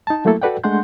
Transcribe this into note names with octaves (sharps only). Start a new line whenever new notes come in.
D#4 A5
F#3 A3 A#3 E4 A4
F#4 A4 B4 D5 F#5 G5
G#3 A3 D4 F#5 C6 G6